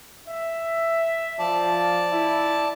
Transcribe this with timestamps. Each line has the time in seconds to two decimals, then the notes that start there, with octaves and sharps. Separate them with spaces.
0.28 E5
1.39 F3 D5 A5
2.11 E4